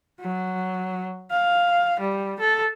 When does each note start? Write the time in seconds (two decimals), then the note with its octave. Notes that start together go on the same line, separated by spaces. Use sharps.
0.20 F#3
1.31 F5
2.00 G3
2.40 A4